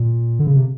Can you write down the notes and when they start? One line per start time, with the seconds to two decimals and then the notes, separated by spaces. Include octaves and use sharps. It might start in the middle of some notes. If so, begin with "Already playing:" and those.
Already playing: A#2
0.39 D3
0.47 C#3
0.56 C3